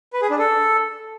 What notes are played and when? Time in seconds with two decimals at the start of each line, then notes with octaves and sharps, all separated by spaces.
0.13 B4
0.22 G#4
0.30 D4
0.39 A4